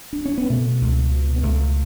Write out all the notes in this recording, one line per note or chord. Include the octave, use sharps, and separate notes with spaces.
D4
C#4
B3
B2 A3
C#2
B2
B3
C#2 A3